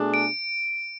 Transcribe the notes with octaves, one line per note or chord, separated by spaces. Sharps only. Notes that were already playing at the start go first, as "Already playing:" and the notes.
Already playing: B2 A3 D4 G#4
D7